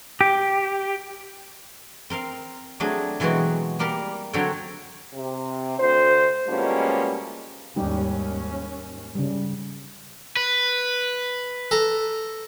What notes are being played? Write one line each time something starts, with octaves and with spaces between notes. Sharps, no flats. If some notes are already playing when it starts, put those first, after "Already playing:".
G4
C4 A#4 F5
F#3 A3 C4 D4 G#4
B2 E3 F#3 G#3 C4 F#4
G3 A#3 G4 A#4
D3 F#3 C4 A4 C#5 G5
C3
D2 C5
B2 F3 G3 G#3 A#3 C#4
D#2 G#2 G3 C#4 D#4 G4
C#3 G3
B4
A4 A#5